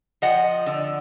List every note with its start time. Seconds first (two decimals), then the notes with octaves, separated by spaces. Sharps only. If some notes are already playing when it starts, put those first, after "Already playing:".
0.22 F3 D#5 F#5
0.66 D3